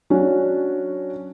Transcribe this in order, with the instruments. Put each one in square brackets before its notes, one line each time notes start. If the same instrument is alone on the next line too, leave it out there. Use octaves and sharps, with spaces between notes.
[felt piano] F#3 C#4 D4 F#4